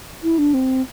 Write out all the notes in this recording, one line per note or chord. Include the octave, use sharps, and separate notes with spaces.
E4
D4
C4